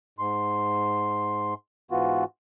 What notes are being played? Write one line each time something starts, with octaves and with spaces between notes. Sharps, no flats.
G#2 C6
G#2 E3 B3 F4 F#4